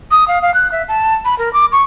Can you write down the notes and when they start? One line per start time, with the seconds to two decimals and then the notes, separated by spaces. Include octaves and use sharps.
0.11 D#6
0.28 F5
0.42 F5
0.54 F#6
0.72 E5
0.89 A5
1.25 B5
1.39 A#4
1.53 D6
1.72 C#6